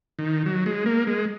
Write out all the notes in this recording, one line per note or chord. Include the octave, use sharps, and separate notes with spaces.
D#3
F#3
G#3
A#3
G#3